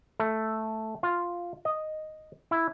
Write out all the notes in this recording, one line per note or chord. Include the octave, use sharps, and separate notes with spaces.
A3
F4
D#5
E4